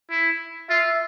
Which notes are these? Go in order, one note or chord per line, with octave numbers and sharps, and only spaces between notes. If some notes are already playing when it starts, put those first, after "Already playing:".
E4
F4 E5